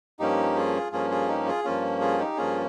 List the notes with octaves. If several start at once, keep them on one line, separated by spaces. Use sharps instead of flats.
G2 F3 A#3 C#4 D#4 G4
F4 G#4
G2 F3 A#3 C#4 F4 G#4
F4 G#4
D#4 G4
F4 G#4
G2 F3 A#3 C#4 F4
F4 G#4
D#4 G4
G2 F3 A#3 C#4 F4 G#4